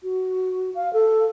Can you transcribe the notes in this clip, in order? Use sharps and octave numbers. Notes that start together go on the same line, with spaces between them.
F#4
F5
A4